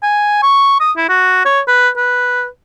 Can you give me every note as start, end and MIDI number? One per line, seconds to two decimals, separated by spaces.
0.03 0.39 80
0.43 0.77 85
0.80 0.92 87
0.97 1.07 64
1.09 1.45 66
1.45 1.61 73
1.68 1.89 71
1.97 2.46 71